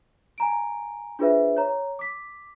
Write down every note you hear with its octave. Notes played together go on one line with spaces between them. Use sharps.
G#5 A#5 D7
D4 F4 G#4 B4 C5 E5
C#5 A#5
D6 B6